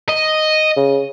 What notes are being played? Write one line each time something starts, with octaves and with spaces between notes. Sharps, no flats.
D#5
C#3